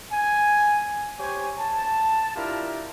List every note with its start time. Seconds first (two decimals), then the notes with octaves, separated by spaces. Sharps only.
0.12 G#5
1.19 G4 C5 C#5 G#5
1.58 A5
2.36 D4 E4 F4 G4 A#4